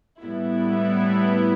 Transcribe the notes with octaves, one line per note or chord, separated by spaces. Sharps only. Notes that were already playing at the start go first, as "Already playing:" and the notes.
A2 G3 B3 E4